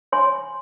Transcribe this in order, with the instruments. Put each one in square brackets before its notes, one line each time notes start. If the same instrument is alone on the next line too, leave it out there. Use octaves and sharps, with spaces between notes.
[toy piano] C#5 G#5 C6